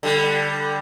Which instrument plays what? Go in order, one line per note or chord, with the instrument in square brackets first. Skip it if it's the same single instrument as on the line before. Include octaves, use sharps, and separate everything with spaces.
[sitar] D3 G3